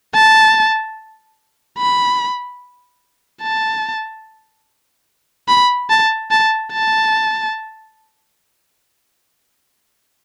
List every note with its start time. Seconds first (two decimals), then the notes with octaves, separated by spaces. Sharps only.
0.14 A5
1.78 B5
3.43 A5
5.48 B5
5.90 A5
6.31 A5
6.72 A5